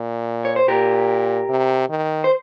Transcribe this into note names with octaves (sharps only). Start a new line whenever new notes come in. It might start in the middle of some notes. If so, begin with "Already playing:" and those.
Already playing: A#2
C#5
C5
A#2 G4 A#4
C3
D#3
C5